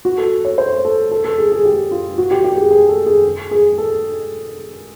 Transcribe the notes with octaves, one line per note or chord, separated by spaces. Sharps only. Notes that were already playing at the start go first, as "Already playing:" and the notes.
F#4
A4
C#5
C5
A4
A4
A4
G#4
G#4
G4
F4
F#4
G4
G4
G#4
G#4
A4
G#4
G#4
A4